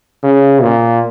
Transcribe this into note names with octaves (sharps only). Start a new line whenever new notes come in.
C#3
A#2